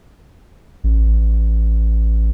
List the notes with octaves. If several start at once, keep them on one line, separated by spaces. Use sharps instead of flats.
A1